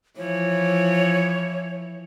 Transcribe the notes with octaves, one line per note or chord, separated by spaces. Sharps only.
E3 F3 C#5